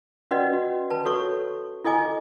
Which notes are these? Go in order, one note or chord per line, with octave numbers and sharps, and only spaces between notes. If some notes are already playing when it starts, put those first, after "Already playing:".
C#4 F#4 B4 D5 D#5 F#5
F#4
B4 A5
F#4 A4 C#5 C#6
E4 A4 D#5 G#5 D6